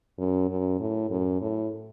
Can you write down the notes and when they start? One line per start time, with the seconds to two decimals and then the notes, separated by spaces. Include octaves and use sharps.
0.18 F#2
0.49 F#2
0.80 A2
1.10 F#2
1.41 A2